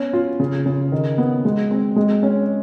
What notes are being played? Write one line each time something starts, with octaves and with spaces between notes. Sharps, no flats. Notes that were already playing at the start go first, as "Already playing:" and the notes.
Already playing: B3 C#4
F4
C#3
C#3
D#3
B3
G#3
C4
G#3
C#4